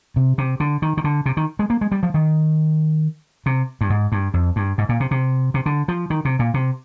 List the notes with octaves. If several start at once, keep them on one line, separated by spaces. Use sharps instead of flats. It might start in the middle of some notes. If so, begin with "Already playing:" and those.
C3
C3
D3
D#3
D#3
D3
C3
D#3
G#3
A#3
G#3
G3
F3
D#3
C3
G2
G#2
G2
F2
G2
G#2
A#2
C3
C3
C3
D3
F3
D#3
C3
A#2
C3